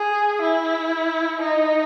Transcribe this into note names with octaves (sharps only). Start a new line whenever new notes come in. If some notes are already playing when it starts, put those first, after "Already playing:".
Already playing: G#4
E4
D#4